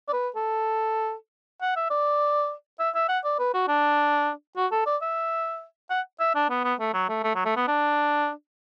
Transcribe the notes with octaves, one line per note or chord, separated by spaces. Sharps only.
D5
B4
A4
F#5
E5
D5
E5
E5
F#5
D5
B4
F#4
D4
F#4
A4
D5
E5
F#5
E5
D4
B3
B3
A3
F#3
A3
A3
F#3
A3
B3
D4